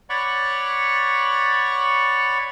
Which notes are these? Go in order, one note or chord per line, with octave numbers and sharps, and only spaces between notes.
C#5 D5 F#5 B5 C#6